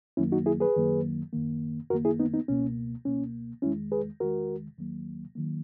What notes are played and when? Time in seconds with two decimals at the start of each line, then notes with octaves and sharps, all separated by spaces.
0.17 F#2 D#3 F#3 A#3 C#4 E4
0.32 D#4 F#4
0.46 E4 G#4
0.60 G#4 B4
0.76 F#2 D#3 F#3 A#3
1.33 F#2 D#3 A#3
1.90 F#2 F#4 A#4
1.93 D#3 A#3
2.05 E4 G#4
2.20 B3 D#4
2.34 B3 D#4
2.48 C#2 B2 A#3 C#4
3.05 C#2 B2 A#3 C#4
3.62 E2 D#3 G#3 C#4 E4
3.92 G#4 B4
4.20 E2 D#3 G#3 F#4 A#4
4.78 D#2 D#3 F#3 A#3
5.35 D#3 F#3 A#3